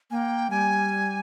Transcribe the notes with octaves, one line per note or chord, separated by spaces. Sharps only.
A#3 G5 G#5
G3 G#5